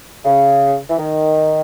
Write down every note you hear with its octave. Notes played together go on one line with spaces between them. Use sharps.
C#3
E3
D#3